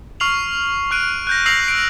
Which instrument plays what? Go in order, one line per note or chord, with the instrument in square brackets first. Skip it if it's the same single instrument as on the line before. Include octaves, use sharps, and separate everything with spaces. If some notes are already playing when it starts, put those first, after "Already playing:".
[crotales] C#6 F6 C7 F7 F#7
C#6 F#6 D7 D#7
F#6 G6 A#6
E6 A#6 C7 F7 F#7
D7